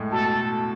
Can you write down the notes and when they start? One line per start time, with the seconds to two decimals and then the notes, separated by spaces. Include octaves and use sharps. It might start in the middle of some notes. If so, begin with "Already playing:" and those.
Already playing: A2 G#3
0.11 B2 A4